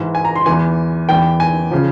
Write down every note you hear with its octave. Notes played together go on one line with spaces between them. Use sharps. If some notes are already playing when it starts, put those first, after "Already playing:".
Already playing: G#2 E3
G#5
A#5
C6
E2 E3 G#5
E2 E3 G5
G#5
C#3 F3